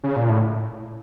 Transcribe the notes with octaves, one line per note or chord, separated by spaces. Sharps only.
C#3
A#2
A2